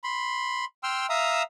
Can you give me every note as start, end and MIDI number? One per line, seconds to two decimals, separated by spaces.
0.04 0.65 83
0.04 0.65 84
0.83 1.06 79
0.83 1.06 84
0.83 1.06 88
0.83 1.06 89
1.10 1.43 76
1.10 1.43 77
1.10 1.43 82
1.10 1.43 87
1.10 1.43 88